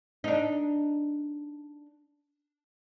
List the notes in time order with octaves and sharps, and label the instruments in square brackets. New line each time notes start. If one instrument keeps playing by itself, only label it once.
[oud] D4 D#4